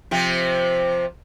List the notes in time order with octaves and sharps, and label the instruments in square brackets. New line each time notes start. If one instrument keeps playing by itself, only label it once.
[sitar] C3 F3 C4